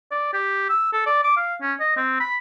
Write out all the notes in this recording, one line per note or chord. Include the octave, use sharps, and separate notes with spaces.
D5
G4
E6
A4
D5
D6
F5
C#4
D#5
C4
B5